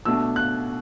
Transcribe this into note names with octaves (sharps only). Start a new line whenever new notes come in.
B2 A3 D4 E6
F#6